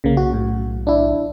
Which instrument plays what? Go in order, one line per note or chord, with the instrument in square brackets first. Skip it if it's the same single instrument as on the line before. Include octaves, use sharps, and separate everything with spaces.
[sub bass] B1 [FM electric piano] C#3 A#3
[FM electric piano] F#4
A2
D4 E4